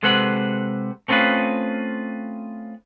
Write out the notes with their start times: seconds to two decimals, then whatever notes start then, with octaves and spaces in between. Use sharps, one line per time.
0.03 C3 G#3 A4 B4 C5 F#5
1.08 A3 C4 C#4 F4 G#4 B4